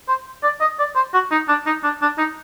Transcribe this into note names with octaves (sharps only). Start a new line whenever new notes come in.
C5
D5
D#5
D5
C5
F#4
D#4
D4
D#4
D4
D4
D#4